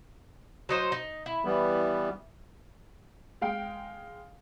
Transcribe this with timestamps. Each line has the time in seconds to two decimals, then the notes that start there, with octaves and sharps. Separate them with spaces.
0.69 F#3 D#4 C5
0.92 D#4
1.26 E4
1.45 E3 G3 B3
3.41 G#3 F5 G5